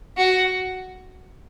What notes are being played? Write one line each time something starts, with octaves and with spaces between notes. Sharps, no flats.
F#4